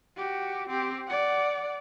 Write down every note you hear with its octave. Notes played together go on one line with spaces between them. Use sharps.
F#4 G4
C4 G4
D5 F#5